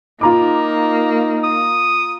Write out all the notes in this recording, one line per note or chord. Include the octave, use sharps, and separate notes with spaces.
A#3 D#4 F4 A#5 D6
D#6